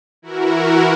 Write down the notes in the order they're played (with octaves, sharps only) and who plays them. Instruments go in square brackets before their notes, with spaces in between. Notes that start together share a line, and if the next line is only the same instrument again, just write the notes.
[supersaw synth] E3 E4 F#4 A#4